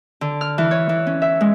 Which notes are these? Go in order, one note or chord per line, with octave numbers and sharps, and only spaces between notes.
D3
F6
E3
C#5
E3
C#4
E5
G#3